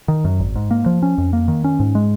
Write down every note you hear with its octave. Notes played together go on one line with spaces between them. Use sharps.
D#3
F#2
G#1
G#2
A#3
F3
C#4
F2
A#3
D#3
C#4
G#2
G#3